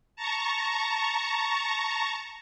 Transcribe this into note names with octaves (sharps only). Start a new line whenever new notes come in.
A5 A#5 C#6